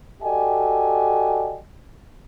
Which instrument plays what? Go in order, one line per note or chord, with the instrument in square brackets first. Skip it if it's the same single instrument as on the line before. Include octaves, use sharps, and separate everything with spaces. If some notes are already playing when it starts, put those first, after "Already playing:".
[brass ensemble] F#4 G4 A4 D5 D#5 G#5